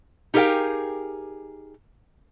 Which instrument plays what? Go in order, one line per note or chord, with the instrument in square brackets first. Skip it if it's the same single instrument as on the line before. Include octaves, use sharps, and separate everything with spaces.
[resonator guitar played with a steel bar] D#4 G4 G#4 A#4 F5 G5